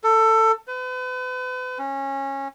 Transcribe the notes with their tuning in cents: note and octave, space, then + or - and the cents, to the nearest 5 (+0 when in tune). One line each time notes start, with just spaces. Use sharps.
A4 +20
B4 +40
C#4 -20